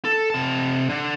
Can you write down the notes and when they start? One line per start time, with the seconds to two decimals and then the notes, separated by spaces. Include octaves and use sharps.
0.05 A4
0.30 C3 A5
0.89 D3